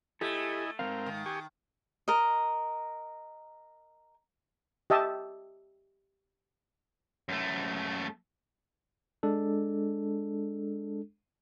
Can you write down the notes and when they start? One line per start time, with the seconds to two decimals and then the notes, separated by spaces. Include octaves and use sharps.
0.21 A3 E4 G4 A4 D#5 G#5
0.79 G#2 F3 C4 A#4 F5
1.06 D#3
1.26 G4 G#5 C#6
2.08 A#4 D#5
4.90 G4 D#5 E5 A5
7.29 F#2 A3
9.23 G#3 D4 A4